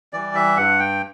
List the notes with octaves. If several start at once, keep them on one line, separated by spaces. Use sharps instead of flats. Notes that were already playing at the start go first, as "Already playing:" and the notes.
E3 G3 D5
E5
G2 F#5
G5